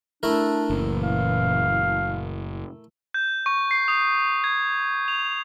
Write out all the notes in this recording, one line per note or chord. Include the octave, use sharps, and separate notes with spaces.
A3 D4 E4 A#4
F#1 A#2 E3
F5
G6
C#6
C7
D#6
G#6
F7